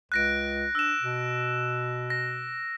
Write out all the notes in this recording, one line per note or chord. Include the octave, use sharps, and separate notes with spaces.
C#2 F#6 A#6 D7
D4 E6 E7
B2
A#6